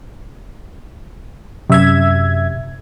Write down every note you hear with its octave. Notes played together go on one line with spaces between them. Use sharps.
F#2 C3 E5 G#6